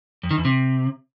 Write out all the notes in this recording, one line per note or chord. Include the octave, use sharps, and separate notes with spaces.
F2
D#3
E2
C3